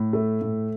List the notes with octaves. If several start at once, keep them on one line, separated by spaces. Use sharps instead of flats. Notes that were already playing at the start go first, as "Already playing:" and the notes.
Already playing: A2
A3
A2